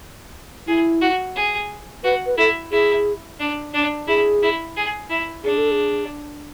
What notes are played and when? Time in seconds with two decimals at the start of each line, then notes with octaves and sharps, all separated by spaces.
0.67 E4 G#4
1.01 F#4
1.36 G#4
2.04 F#4 B4
2.26 B4
2.38 E4 A4
2.72 E4 G#4
3.39 D4
3.74 D4
4.08 E4 G#4
4.42 E4
4.76 G#4
5.10 E4
5.44 D4 G#4
5.58 A4
5.71 G#4